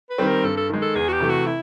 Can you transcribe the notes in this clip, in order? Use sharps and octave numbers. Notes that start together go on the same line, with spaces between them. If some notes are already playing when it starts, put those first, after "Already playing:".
B4
D#3 G3 C4
A#4
G2 A4
A4
D#3 G#3
A4
E2 G#4
F#4
G4
C3 E3 A3
F#4
E4